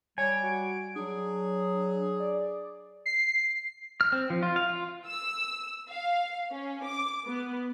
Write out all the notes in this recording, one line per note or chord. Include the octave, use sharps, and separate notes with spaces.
G3 C#5 G#5 D7
F#4
F#3 D4 G#4
D5
C7
F6
C4
F3
F4
F5
F4
E6
F5
C#4
D6
B3